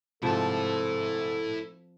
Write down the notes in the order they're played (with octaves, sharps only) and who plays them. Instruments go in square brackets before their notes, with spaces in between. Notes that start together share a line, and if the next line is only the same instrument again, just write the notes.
[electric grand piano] G#2 C3 [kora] F3 C4 [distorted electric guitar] E4 A5 [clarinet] A4